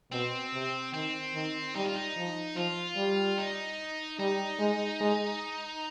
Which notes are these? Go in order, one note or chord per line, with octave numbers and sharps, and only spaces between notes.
B2 C4
C3
D#3 C4
D#3
G3 D#4
F4
D#4
F3
F3 F4
G3
D#4
G3 D#4
G#3
G#3